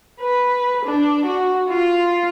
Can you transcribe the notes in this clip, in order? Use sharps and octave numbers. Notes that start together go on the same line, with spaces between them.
B4
D4
F#4
F4